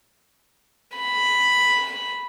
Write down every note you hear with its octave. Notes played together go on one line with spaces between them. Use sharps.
B5